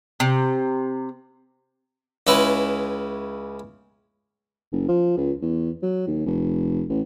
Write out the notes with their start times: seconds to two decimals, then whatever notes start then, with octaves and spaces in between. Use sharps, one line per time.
0.20 C3
2.27 C#2 C#3 G#3 E4 B4
4.72 F#1
4.88 F3
5.17 C#2
5.42 E2
5.82 F#3
6.07 D#2
6.26 F1
6.89 A1